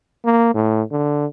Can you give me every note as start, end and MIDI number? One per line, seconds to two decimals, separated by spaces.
0.25 0.52 58
0.55 0.83 45
0.92 1.26 50